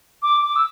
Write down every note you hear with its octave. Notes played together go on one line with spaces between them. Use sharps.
D6
D6
E6